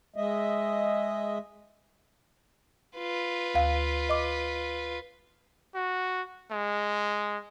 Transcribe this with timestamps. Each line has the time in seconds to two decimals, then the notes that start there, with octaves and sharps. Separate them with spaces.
0.16 G#3 D#5 E5
2.98 F4 B4
3.54 D2 F5
4.09 D#5 D6
5.75 F#4
6.52 G#3